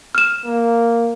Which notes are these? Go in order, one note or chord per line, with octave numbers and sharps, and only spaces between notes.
F6 E7
A#3